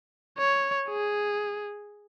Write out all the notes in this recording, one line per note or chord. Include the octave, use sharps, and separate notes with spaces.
C#5
G#4